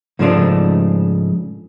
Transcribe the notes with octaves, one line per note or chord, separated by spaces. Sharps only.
G#2 C#3 F3 G#3 A3 D4